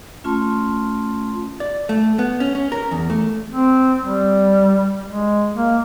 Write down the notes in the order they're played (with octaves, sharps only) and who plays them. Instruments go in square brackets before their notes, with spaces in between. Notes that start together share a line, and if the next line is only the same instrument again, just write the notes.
[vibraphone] A3 C#4 F4 A5 C6
[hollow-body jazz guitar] D5
A3
B3
C#4
C#4
A#4
E2
A3
[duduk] C4
G3
G#3
A#3